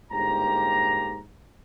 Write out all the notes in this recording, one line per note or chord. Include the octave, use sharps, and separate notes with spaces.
G1 G#2 A#3 G4 A#5